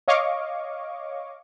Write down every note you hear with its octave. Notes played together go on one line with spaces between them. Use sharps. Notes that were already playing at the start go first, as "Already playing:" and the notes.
C#5 D#5 F5 C#6 D6